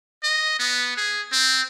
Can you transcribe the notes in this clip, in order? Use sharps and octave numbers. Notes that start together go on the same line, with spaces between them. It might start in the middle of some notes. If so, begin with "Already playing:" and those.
D#5
B3
G#4
C4